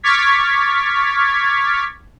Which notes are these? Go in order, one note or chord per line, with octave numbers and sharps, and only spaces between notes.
C#6 D6 F6 G#6 A6 B6